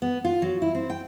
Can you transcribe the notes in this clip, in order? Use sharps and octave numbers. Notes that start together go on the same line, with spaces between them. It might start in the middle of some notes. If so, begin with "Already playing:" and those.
B3
F4
F#3
E4
C4
G5